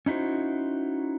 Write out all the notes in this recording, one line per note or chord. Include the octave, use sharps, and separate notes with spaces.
C#4 D#4 E4 F#4 C5